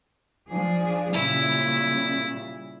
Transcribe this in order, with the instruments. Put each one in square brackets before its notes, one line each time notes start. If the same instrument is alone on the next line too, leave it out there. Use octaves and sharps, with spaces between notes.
[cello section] F3 D4 G#4
[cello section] A#2 C#3 G3 [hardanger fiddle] E4